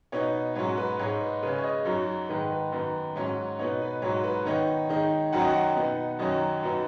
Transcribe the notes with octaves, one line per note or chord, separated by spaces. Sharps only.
B2 B3 D#4 C#5
G#2 F#3 C#4 C#5
B4
G#2 G#3 D#4 C#5
B4
C#3 G#3 C#4 B4
C#5
D#5
F#2 F#3 D#4 C#5
G#2 D#3 G#3 B4
B4
F#2 D#3 B3
G#2 F#3 C#4
B2 B3 D#4 C#5
B4
G#2 F#3 D#4 C#5
B4
D#3 B3 D#4 C#5
D#3 G#3 D#4
F#2 D#3 F#3 C#4 F#5
D#5
F#5
B2 B3 D#4
F#2 D#3 F#3 C#4 D#5
F#2 F#3 B3 D#4